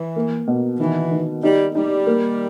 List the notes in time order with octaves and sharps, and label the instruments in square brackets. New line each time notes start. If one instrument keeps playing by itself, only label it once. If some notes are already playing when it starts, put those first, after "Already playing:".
Already playing: [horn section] E3
[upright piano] A#3
B2
[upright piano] D#3 [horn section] E3
[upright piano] D#3
[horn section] G3 [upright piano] D#4
[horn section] G3 [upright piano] D#4
[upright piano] A#3